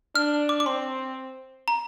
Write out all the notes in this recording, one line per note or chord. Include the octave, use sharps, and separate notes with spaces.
D4 F6
D6
D6
C4 C6
A#5